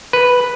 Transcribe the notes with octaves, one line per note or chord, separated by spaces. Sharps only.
B4